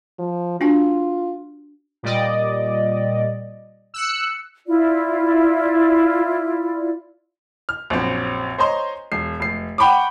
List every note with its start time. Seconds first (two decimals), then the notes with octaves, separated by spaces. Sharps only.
0.19 F3
0.61 D4 F4 F#4 G#5
2.03 A#2 G3 D5 D#5
3.94 E6 F#6 C#7
4.67 E4 F4 D5
7.69 F6
7.90 A#1 F#2 C4
8.58 C5 C#5 D#5 G#5 A#5 C6
9.12 E1 C7
9.40 F1 C7
9.78 F#5 G5 B5 C#6 D6